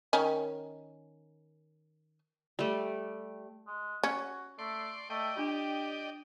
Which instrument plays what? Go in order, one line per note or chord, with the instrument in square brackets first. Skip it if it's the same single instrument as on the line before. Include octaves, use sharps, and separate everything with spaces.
[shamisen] D#3 C#4 G#5
[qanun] G3 A3
[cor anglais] G#3
[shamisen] C#4 [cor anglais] F#4
[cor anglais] A3 [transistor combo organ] D5 C6
[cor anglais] A3 [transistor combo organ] D5 D#5 G5
[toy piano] D4 F4 [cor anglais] G4